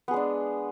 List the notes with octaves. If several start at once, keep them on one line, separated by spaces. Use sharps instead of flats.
G#3 B3 D4 G#4